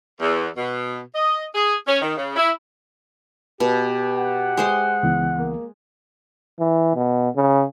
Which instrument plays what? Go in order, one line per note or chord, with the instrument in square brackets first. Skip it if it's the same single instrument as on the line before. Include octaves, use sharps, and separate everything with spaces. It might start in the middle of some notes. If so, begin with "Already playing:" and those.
[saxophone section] E2
B2
D#5
G#4
C#4
D#3
C#3
E4
[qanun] B2 [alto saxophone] G4
[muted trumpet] F#5
[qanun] G#3 C5 C6
[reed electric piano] C#2 E3 B3
[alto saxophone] A#3
[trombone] E3
B2
C#3